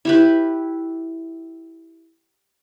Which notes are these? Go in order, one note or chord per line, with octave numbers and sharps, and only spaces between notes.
E4 G4 B4